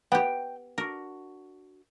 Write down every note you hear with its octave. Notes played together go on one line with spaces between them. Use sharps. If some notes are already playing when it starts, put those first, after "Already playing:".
B3 G4 G5
D4 F#4 A#4